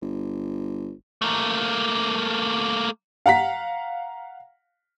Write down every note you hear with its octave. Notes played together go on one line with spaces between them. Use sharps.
G1
A3 A#3
F5 F#5 A#5 B6